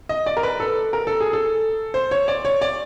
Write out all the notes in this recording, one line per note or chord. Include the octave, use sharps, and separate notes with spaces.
D#5
D5
A#4
B4
A4
A#4
A4
G#4
A4
C5
C#5
D5
C#5
D5